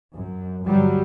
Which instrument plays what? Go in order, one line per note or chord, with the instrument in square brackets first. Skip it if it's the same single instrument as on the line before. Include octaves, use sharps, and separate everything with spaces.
[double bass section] F#2
G1 F#3 G3